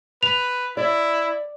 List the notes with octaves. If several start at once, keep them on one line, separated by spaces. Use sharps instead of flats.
B4 F7
E4 D5